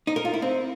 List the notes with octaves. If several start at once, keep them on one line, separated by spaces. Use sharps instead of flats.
D#4
A#4
F4
E4
C4